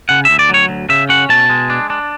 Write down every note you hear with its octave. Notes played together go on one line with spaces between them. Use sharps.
C#3 F#5
D2 E5
D5
F#3 C#5
D2
C#3 E5
C#4 F#5
B2 A5
G#3
D4
D4